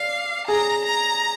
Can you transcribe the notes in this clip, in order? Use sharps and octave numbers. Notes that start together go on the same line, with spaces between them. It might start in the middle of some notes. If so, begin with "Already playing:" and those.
Already playing: D5 F5
G#4 A#5
A#5